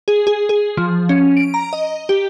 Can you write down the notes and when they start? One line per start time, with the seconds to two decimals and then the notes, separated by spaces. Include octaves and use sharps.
0.08 G#4
0.27 G#4
0.49 G#4
0.77 F3
1.09 C#4
1.37 D7
1.54 A#5
1.73 D#5
2.09 G4